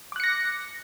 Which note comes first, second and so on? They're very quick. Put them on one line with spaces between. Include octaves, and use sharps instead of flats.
D6 F#6 C#7 A#6